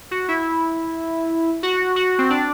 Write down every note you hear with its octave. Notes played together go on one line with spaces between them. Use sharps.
F#4
E4
F#4
F#4
C4
D4